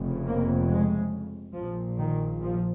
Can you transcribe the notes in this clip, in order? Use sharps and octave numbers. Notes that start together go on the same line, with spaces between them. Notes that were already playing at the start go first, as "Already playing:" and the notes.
Already playing: F1 F2 C#3
A#3
G#3
A#1 A#2 F3
D#3
F3